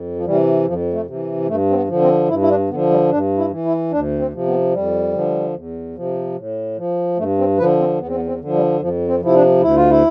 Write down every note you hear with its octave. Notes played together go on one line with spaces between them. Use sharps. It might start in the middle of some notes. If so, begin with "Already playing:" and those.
Already playing: F2
F3
C3 E3 G3
F2 F3
A3
C3 E3
G2 A3
C4
B3
D3 F3
C4
G2 E4
E4
D4
D3 F3 B3
G3
G2 D4
E4
E3
E4
D2 D4
C4
C3 F3
B3
F2 G3
D3 F3
E2
C3 F3
A2
F3
G2 A3
C4
D3 F3 B4
C4
E2 B3
C4
B3
C4
D3 F3
G3
F2 F3
C4
C3 F3 E4
D4
D2 E4
F4
E4